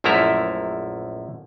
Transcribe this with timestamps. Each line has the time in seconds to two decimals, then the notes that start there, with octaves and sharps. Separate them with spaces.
0.04 A#1 F#2 F3 A3 E4 A#5